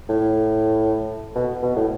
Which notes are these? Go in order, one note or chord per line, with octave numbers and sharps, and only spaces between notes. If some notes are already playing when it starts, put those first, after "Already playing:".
A2
B2
B2
A2